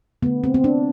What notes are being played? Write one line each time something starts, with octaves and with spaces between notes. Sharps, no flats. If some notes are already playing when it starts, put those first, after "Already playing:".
D3 A3 B3
C4
C4
D4